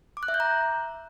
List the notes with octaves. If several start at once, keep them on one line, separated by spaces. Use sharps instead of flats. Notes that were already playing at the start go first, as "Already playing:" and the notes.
D6
F#6
E5
G6
A#5